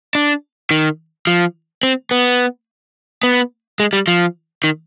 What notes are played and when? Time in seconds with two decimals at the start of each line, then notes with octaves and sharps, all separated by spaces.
0.15 D4
0.71 D#3
1.27 F3
1.83 C4
2.11 B3
3.23 B3
3.80 G#3
3.93 G3
4.08 F3
4.64 D#3